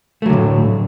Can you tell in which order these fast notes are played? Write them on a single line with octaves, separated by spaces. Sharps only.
A3 F#3 D3 A2